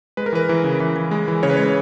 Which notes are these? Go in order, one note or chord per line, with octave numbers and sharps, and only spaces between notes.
G#3 B4
A#4
E3 B4
E3
C#3
E3
E3
G#3
E3
C#3 C#5
B4
G#3 C#5